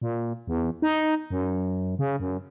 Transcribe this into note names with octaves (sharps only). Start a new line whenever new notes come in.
A#2
E2
D#4
F#2
C#3
F#2